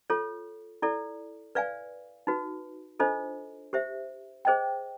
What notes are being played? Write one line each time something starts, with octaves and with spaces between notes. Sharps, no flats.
F4 A4 C#5
E4 A4 D5
B4 D5 F5 G#5
D#4 F#4 B4
D4 F4 A4 C5 D#5
G4 C5 E5
G#4 C5 D#5 G5